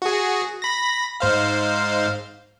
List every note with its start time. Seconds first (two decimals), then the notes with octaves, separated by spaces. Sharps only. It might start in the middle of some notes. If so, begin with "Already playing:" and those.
0.02 F#4 G#4
0.62 B5 A#6
1.20 G#2 C5 F5